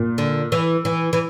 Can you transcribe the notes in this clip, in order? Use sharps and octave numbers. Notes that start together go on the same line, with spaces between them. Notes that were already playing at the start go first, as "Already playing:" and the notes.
Already playing: A#2
D3
E3
E3
E3